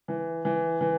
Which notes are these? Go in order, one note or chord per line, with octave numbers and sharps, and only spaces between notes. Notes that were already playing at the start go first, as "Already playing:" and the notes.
E3
E3
E3